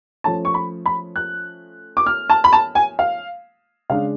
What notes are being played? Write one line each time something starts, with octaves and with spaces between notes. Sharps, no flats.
F3 A3 C#4 A5
C#6
B5
B5
F#6
D6
F6
A5
B5
A5
G#5
F5
C#3 G#3 D4 F5